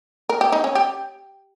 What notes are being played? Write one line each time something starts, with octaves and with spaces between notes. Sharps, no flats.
A#4
G4
D#4
C#4
G4